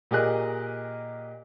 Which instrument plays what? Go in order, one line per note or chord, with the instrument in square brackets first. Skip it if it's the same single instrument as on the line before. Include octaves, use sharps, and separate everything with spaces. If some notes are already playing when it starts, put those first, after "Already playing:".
[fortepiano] A#2 G4 G#4 A#4 D#5 F#6